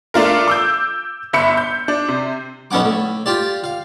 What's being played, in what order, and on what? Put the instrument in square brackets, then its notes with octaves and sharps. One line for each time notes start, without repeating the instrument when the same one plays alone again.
[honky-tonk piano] A3 D4 F4 A#4
D6 E6 G6
G1 E5 B5 C#7
G6
D4
C3
[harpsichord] B1 B3 C#4 F#5 D6
A2
F4 G4 D5
F5